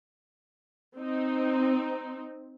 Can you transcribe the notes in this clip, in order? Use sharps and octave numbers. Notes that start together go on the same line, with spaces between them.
C4 D#4